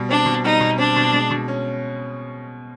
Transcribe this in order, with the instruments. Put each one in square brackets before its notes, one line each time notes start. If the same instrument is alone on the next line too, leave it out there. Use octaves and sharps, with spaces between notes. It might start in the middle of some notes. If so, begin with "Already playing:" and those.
Already playing: [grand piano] B2 G3
[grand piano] C4 [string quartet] D4
[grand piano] B2
[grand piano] G3 [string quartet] D#4
[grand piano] B2
[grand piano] C4 [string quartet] D4
[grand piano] B2
G#3
B2
C#4